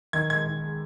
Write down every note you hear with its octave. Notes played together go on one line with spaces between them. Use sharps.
D#3 G#6
G#3 G#6
D#3
G#3